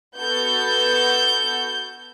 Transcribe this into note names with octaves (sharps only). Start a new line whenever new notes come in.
B3 F#4 A4 G6